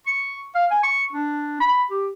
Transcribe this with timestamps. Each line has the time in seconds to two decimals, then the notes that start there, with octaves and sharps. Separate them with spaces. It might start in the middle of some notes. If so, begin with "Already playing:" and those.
0.06 C#6
0.55 F5
0.71 G#5
0.83 C#6
1.13 D4
1.60 B5
1.90 G4